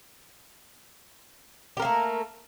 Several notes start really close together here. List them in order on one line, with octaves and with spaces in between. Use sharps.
G4 A#4 A#3 A3